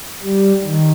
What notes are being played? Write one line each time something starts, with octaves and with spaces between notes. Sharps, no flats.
G3
D#3